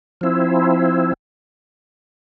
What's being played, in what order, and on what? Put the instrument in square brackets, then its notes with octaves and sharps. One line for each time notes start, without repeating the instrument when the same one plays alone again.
[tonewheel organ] F3 C4 E4